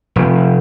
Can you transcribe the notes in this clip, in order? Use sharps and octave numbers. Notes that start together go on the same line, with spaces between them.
F1